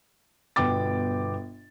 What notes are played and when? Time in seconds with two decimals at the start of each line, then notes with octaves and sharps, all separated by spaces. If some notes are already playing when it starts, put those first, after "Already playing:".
0.56 G1 B2 B3 G5 D6 A6